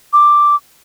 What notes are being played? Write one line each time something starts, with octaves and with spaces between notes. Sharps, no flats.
D6